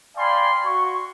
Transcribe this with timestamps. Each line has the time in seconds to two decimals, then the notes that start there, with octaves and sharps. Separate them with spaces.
0.17 D5 F5 G5 G#5 B5 C6
0.65 F#4 C#6